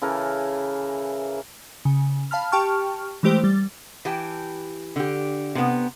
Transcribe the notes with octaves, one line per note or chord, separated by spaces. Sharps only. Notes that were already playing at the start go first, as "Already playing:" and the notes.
C#3 E3 A4 A#4
C#3
F5 A5 B5 F6
G4 G5 A5 C#6 F6
E3 G#3 A3 G4 C5
G3 A6
E3 G4 G5 A5
D3 G4
C3 B3